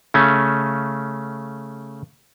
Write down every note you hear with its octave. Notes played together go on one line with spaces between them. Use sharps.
C#3 A3 C#4